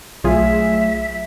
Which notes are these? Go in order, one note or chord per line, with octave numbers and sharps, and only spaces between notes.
B1 F#3 A3 F4 G#4 E5